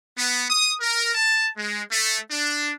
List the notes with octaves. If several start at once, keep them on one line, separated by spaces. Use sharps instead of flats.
B3
D#6
A#4
A5
G#3
A3
D4